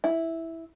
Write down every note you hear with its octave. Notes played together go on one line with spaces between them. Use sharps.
E4